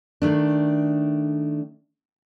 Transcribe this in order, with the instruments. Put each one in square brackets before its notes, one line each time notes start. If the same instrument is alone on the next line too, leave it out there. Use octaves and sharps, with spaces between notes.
[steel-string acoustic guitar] D#3 A3 D4